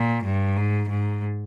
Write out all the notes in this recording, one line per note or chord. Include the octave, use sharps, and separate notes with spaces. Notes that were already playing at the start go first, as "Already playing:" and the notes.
Already playing: A#2
G2
G#2
G#2